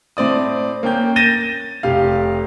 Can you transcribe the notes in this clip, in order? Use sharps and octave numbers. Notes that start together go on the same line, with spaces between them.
A2 C4 D5 D#6
A#3 C#4 G5 G6
G6 A6 A#6 D#7 E7 G7
F1 G4 F5